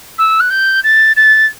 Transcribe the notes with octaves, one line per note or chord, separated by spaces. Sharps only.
E6
F#6
G6
A6
A6